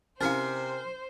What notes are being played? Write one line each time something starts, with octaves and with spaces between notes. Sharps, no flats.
C3 C#4 E4 A#4 C5 F5 G#5